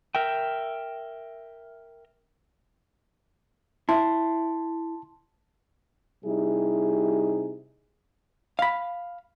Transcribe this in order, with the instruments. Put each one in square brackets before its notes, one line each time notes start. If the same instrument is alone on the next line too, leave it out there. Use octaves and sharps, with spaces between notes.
[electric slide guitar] A#4 E5 G5
[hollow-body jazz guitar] E4 [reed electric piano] A5 C6
[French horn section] C3 G3 D#4 E4 G#4
[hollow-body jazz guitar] F5 B5